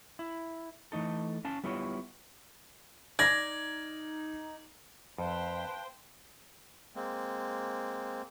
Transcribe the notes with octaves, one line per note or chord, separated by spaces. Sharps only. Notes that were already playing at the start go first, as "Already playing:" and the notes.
E4
E3 A3 D#4 A4
C#4 F5 A5
G3 B3 E4 F4 C#5
D#4 D5 G#6 A#6
F2 B4 C5 F5 G5 A5
G#3 A#3 C4